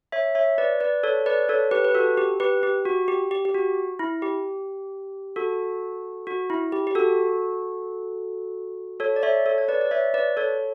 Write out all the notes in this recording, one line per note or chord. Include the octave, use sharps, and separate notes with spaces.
C#5 E5
C#5 E5
B4 D5
B4 D5
A4 C#5
B4 D5
A4 C#5
G4 B4
B4
F#4 A4
G4
G4 B4
G4
F#4
G4
G4
G4
F#4
E4
G4
F#4 A4
F#4
E4
G4
G4
F#4 A4
A4 C#5
D5
C#5 E5
A4 C#5
C#5
B4 D5
D5
C#5 E5
B4 D5
A4 C#5